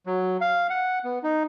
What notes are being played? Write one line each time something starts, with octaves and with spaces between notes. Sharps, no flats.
F#3
F5
F#5
B3
D#4